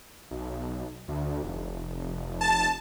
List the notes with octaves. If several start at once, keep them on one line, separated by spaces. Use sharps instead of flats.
B1
D2
F1
A5